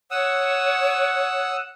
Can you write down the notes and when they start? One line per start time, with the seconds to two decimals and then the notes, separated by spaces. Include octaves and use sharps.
0.11 C#5 F#5 D#6 E6